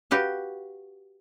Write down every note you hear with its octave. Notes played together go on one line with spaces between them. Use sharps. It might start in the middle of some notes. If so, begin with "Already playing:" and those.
F#4 G4 B4 F5